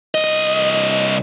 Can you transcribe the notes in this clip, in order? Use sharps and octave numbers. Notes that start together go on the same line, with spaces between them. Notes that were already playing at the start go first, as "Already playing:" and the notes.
C2 D#5